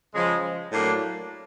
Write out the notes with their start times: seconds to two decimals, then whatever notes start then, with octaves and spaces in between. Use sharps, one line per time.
0.14 C#3 F3 G#3
0.72 A2 F#3 A#3 D4